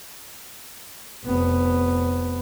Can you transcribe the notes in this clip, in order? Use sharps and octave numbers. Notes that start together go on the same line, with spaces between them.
F1 B3